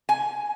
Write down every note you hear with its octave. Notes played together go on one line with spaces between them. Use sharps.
G#5